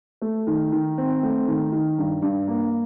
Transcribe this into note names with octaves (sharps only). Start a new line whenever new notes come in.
A3
D#3
D#3
C4
A3
D#3
D#3
G2
G2
A#3